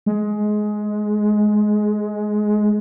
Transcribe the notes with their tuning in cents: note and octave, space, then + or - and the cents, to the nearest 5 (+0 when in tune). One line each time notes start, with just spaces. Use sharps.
G#3 +15